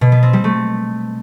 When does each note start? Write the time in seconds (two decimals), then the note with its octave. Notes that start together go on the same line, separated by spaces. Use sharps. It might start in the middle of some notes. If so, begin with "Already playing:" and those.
0.01 B2
0.12 B3
0.23 C4
0.33 G3
0.44 A3